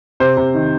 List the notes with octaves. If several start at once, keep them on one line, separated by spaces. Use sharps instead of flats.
C3 C5
C3
D#3